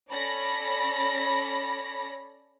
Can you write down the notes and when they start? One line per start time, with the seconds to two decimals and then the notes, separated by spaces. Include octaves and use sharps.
0.10 C#4 A4 C#5 D5 B5 A#6